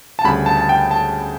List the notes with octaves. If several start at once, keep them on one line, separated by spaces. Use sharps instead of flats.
A5
D2 C#3 G3 B5
A5
A5
G5
A5